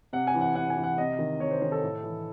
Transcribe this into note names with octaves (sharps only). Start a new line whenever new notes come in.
C3 F#5
G#5
E3
F#5
C3 F#5
G#5
E3
F#5
C3 D#5
D#3
C3 C#5
C5
D#3 C5
A4
A2
E3